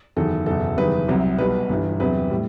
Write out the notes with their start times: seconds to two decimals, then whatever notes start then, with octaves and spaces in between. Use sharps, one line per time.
0.16 F#1 E2 D#3 F#3 A4
0.46 F#1 E2 B2 A4
0.77 F#1 E2 D#3 G3 B4
1.08 C2 C3 F#3
1.38 B1 B2 G3 B4
1.69 G1 G2 E3 G3
2.00 E2 C3 F#3 B4
2.30 A2 G3